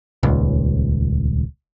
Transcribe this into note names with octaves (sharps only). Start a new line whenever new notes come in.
D#1 C#2